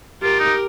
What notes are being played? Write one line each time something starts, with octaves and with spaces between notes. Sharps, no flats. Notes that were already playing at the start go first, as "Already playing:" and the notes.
F4 G4 A#4
D#4